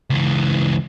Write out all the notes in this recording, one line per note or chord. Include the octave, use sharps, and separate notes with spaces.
C#2 E3